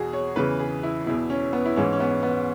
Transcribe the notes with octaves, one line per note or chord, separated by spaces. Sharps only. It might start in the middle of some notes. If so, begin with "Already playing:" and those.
Already playing: E2 B2 F#4 G#4
C#5
E2 C#3 E3 B4
G#4
E4
E2 B2 E4
C#4
B3
E4
G#2 E3 C#4
C#4
B3
B3